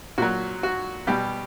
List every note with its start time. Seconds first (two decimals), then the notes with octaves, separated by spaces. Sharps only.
0.18 A#2 F#3 F#4
0.63 F#4
1.07 B2 G3 G4